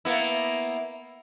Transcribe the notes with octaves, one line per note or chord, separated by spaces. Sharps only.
A#3 B3 E4